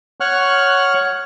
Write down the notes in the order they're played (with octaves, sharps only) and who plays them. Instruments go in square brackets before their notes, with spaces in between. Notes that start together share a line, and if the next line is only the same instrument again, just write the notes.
[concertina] C#5 F#5 C#6 F6 F#6